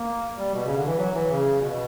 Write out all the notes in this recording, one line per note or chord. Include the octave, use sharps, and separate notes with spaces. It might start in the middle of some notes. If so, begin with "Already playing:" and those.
Already playing: A#3
G3
B2
C#3
D3
E3
F#3
E3
C#3
B2